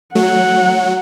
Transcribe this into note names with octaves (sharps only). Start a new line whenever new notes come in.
F#3 A3 F#5